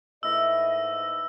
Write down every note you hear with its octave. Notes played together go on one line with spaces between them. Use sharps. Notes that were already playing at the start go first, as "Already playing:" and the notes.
G#2 A3 E4 B4 D#5 E6